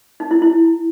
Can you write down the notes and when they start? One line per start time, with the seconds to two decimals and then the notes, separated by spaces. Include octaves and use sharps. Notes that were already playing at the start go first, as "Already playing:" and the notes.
0.20 D#4
0.31 E4
0.42 E4